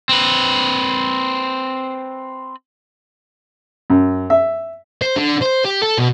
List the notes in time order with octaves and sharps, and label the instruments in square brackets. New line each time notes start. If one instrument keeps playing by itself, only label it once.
[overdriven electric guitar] C4 B4
[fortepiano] F#2
E5
[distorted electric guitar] C5
D3
C5
G4
A4
B2